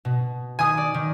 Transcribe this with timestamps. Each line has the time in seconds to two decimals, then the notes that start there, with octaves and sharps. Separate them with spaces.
0.05 B2
0.59 D#3 G#5 D#6
0.77 D5
0.94 D#3